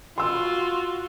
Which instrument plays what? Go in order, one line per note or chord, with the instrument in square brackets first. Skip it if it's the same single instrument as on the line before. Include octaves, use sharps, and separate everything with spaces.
[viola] F4 F#4 [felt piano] C6 E6